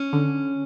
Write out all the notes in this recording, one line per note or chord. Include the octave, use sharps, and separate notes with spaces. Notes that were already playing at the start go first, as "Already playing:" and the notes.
Already playing: C#4
D3